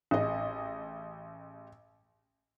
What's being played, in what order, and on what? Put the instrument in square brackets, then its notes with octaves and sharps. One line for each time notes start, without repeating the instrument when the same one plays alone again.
[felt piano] A1 G#4 D#5